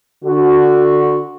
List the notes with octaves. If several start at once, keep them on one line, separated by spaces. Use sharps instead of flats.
D3 F#4